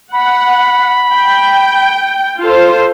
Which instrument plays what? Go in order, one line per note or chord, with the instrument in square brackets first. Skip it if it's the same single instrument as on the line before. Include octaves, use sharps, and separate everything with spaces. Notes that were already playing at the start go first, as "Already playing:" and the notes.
[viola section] F#5 [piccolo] B5
[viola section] G5
F4 A4 C5